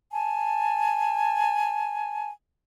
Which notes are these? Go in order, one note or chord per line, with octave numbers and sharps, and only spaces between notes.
G#5 A5